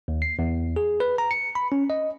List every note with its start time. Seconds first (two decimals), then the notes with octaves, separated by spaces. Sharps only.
0.08 D#2
0.22 C7
0.39 E2
0.76 G#4
1.00 B4
1.18 A#5
1.31 C#7
1.55 B5
1.72 C#4
1.90 D#5